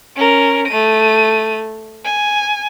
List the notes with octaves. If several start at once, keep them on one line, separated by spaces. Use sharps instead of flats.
C#4 A#4
A3 D#7
G#5